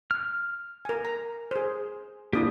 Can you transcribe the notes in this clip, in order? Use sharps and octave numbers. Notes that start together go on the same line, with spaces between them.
F6
A#4 G#5
A#5
G#4 C5
A#3 D4 E4 G4 D#6